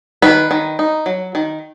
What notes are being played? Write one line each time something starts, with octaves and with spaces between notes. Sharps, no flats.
D#3 B4
D#3
D#4
F#3
D#3